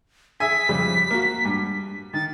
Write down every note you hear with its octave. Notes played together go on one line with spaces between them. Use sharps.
G#4 E5 G#5 B6
F2 C#3 G3
A#3 F#4
G2
D#3 A6